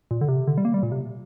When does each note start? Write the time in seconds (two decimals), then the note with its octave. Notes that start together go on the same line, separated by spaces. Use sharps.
0.11 A#2
0.21 D3
0.28 C3
0.47 D3
0.58 G3
0.65 A#3
0.74 G3
0.83 A#2
0.92 C3